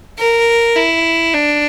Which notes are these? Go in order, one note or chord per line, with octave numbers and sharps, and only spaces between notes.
A#4
E4
D4